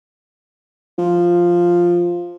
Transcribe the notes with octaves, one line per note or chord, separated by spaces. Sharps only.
F3